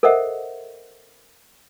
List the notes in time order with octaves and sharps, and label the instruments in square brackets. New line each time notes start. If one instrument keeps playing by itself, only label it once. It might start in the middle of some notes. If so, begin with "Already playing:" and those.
[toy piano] A4 A#4 C5 D#5 E5 F#5